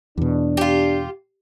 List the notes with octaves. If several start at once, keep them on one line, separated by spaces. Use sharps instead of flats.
E2 B2 D4
F4 G4